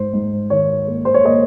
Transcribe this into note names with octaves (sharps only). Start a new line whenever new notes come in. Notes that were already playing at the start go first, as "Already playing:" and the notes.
Already playing: G#2 C5
G#2
D#3 C#5
A#3
C5
C#5
A#3 D#5